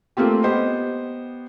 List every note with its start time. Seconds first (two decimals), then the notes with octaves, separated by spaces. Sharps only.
0.17 A3 A#3 C4 F4 G4
0.44 B3 G4 C5 D#5